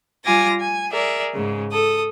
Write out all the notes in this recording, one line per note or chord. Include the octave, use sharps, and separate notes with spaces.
G3 F4 G#5 D6 A6 A#6
G#5
G#4 A#4 D5 E5
G#2 C#3
A4 D#6